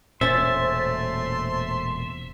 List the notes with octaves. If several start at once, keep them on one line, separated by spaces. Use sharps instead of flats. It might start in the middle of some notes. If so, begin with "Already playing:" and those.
E1 A#2 A3 C#4 C5 E5 C6 A6